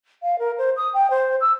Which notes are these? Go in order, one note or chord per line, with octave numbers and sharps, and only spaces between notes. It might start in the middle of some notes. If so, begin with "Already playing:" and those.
F5
A#4
C5
D#6
G5
C5
E6